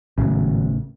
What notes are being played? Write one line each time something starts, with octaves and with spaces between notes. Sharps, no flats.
G#1 A2 C#3 F#3